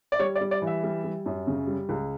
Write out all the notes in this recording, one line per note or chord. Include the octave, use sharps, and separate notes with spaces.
D5
G3 C#5
D5
G3
D5
E3
E5
G3
G3
F#2
C#3
G3
C#2